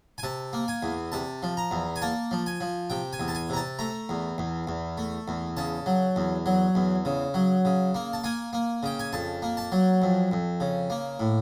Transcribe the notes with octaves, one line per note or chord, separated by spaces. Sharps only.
G#5
C3 A5
A#3
G#5
E2
C3 A5
F3
A#5
E2
G#5
A#3 A5
F3
G#5
F3
C3 G5
G#5
E2
A5
G#5
C3 A#5
A5
A3 A#5
E2
E2
E2
A3
E2
C#3 A5
F#3
E2
F#3
E2
C#3
F#3
C#3
A#3
A5
A#3 G#5
A#3
C#3 G5
G#5
F2 A5
A#3
A5
F#3
F2
F2
C#3
A#3
A2